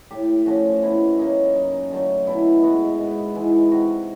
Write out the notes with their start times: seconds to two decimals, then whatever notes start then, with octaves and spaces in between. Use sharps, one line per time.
0.11 A2 G4
0.46 F3 A3 C#4 F#4
0.82 B2 E4
1.19 F#3 A#3 C#4 D#4
1.56 F#2
1.91 D3 F#3 A3
2.27 B2 E4
2.63 G#3 B3 F#4
2.99 G#2
3.35 E3 G#3
3.72 C3 F#4